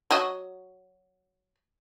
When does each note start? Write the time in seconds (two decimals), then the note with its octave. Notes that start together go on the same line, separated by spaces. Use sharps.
0.11 F#3 F#4 D#5